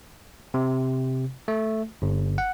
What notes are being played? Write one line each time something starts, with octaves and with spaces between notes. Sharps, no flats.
C3
A3
G1
F#5